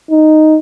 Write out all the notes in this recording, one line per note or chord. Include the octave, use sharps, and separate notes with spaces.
D#4